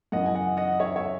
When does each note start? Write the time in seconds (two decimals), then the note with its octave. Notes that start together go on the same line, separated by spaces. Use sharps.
0.12 F#2 C#3 E3 D#5 F#5
0.26 G#5
0.35 D#5 F#5
0.57 D#5 F#5
0.79 C#5 E5
0.96 C#5 E5